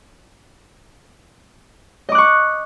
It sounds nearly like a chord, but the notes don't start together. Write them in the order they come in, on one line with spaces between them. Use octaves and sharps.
D#5 D6 F#6 C#6